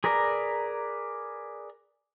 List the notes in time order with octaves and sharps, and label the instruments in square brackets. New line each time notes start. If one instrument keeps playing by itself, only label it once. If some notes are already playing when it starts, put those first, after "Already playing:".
[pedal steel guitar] G#4 A#4 B4 D5 A#5